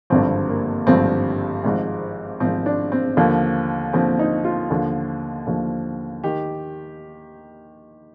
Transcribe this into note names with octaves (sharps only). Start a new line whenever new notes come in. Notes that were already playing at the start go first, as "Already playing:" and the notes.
G#1 G2 D3 F3 C4
A#3
G#1 G2 D3 F3 C4
G#1 G#2 F3
G#1 G#2 F3 C4
D4
C4
D#2 D3 F3 A#3
D#2 D3 F3 C4
D#4
F4
D#2 D3 F3
D#2 D3 F3
D#3 G4